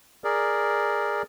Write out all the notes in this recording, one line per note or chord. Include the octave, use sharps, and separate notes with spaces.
G#4 A#4 D5